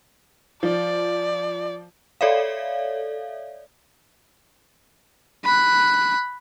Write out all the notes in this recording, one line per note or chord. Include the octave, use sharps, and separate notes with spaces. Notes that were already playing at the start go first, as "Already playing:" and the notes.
F3 D5
A4 C#5 D5 E5 F5
B5 F#6